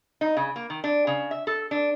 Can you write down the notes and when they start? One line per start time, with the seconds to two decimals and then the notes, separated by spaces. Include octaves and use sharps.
0.21 D#4
0.37 C#3
0.56 A#3
0.70 D#3
0.84 D4
1.07 C#3
1.31 E5
1.47 A4
1.71 D4